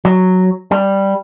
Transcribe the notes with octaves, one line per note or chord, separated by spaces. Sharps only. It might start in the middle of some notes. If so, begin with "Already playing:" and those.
F#3
G3